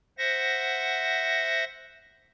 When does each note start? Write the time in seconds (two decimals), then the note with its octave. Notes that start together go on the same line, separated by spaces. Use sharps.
0.18 C5 E5 F#5 A#6